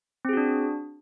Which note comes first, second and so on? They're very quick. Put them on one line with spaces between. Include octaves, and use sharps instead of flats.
C4 G#4 F#4 D4